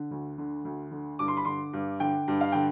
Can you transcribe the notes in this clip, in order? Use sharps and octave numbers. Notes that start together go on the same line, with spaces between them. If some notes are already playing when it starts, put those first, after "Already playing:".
Already playing: D3
D2
D3
D2
D3
G2 D6
C6
B5
D3 C6
G2
D3 G5
G2
F5
D3 G5